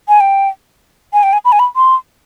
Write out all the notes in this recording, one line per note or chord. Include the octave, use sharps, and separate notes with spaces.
G#5
G5
G#5
G5
G#5
B5
G#5
B5
C6